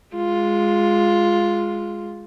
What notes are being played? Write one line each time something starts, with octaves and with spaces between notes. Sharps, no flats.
G#3 F4